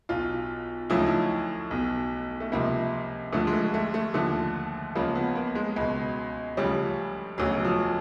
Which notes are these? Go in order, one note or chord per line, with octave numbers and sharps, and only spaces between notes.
B1 B2 F4
D2 C#3 F3 E4
D#4
E4
B1 B2
A3
C#2 C3 F3 A#3
D2 D3 F3 A3
G#3
A3
A3
A3
D#2 D3 F3 A3
C#2 C#3 F3 A#3
B3
A#3
G#3
C#2 B2
D2 C#3 F3 G3
E1 D2 C#3 F#3
F3